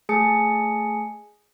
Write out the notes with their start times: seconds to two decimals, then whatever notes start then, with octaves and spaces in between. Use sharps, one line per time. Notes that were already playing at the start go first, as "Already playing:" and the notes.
0.09 A3 G#4 G#5 A5 D#6 C#7